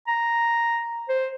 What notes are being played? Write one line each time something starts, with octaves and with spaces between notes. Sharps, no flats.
A#5
C5